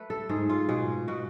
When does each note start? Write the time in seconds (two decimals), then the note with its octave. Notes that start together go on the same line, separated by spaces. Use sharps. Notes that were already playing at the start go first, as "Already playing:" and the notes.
Already playing: A3 B4
0.10 A4
0.29 G#2 G#4
0.49 F4
0.69 B2 G#4
1.08 B2 F#4